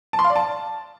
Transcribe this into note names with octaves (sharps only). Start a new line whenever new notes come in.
A5
C6
F5
D5
A5